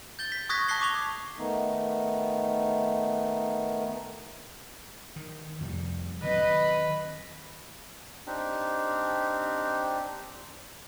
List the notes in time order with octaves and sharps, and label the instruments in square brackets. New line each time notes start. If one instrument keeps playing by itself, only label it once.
[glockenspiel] G6 A6 G7
B6
C#6 D#6 F#6 G#6 A#6 B6
A5 C#6 F#6 A#6 C7 G7
D6 B6 F7 G7
[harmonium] D#3 A3 B3 D#4
[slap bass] D#3
F2 C3 G3
[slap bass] D#3 F#3 C4 [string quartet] B4 D#5 B5
[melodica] C4 D4 D#4 G4